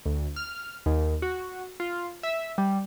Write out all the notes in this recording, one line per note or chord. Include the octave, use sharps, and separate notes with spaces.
D2
F6
D#2
F#4
F4
E5
G3